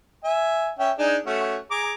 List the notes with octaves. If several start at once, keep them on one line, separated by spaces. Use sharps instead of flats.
E5 G#5
C#4 E5 G5
D4 D#4 G#4
A3 C#4 F#4
G#4 A#5 D6